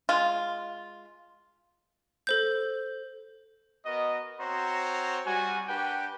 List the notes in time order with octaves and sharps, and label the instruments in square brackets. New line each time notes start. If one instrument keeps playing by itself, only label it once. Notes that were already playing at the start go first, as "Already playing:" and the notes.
[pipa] G#3 F4
[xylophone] A4 C5 G6
[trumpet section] B3 F#4 A#4 D#5
C4 F#4 C5 C#5 A#5
G3 F#4 G#5
D4 G4 A#4 B4 F#5 G5